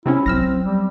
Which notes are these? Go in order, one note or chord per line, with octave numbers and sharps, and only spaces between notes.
C3 C4 C#4 E4
F#3 B3 C4 E6 F6 A#6
G3